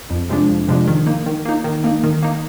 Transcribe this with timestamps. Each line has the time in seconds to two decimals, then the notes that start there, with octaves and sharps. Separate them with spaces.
0.10 F2
0.29 C3 F3 G#3 D4
0.49 F2
0.68 C3 F3 G#3 D4
0.87 D#3
1.06 A#3 D#4
1.26 D#3
1.45 A#3 D#4
1.64 D#3
1.84 A#3 D#4
2.04 D#3
2.23 A#3 D#4